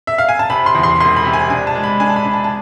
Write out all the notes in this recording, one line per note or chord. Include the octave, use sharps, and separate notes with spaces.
E5
F5
G#5
A5
C3 B5
C6
E2
C6
E1 C6
B5
C3
G#5
D4 G#5
A5
G#3
B5
D4 G#5
A5
B5
D4
A5
A5